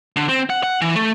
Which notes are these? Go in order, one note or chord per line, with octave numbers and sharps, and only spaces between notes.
D3
C4
F#5
F#5
E3
A3